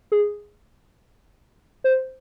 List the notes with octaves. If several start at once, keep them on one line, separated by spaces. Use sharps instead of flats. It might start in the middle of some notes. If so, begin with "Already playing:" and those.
G#4
C5